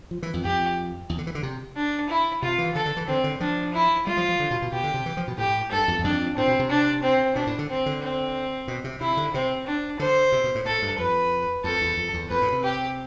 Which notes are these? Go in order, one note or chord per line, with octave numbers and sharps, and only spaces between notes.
F3
E3
F2
F2 G4
E2
D3
E3
D3
C3
D4
E4
C3 F4
E3
D3 A4
D3
E3
D3 C4
D3
F3 D4
E4
G3 F4
F3
F3
D3
B2
B2
B2 G4
D3
C3
E3
F3
B2
A2 G4
G2 A4
F2
E2
F2 D4
A2 C4
B2
C3
D4
C4
B2 D4
A2
D3
C4
D3
C4
B2
C3
C3 E4
D3
C3 C4
D4
D3 C5
C3
B2
A2
A2 A4
G2
F2 B4
F2 A4
E2
F2
E2
F2 B4
A2
C3
G4